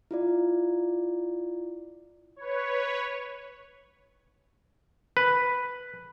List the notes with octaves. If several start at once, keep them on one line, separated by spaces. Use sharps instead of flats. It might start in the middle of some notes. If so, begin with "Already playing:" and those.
E4 F4 D5
B4 C#5
B4